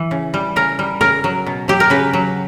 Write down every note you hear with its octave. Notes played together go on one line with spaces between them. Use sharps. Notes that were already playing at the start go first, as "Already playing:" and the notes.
Already playing: E3
C#3
G3
C#3 A#4
G3
C#3 A#4
F#3
B2
F#3 G4
A#4
C#3 B4
F#3